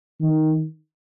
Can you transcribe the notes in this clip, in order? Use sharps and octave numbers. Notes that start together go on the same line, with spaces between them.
D#3